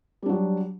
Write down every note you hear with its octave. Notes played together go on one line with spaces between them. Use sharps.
F#3 G3 D4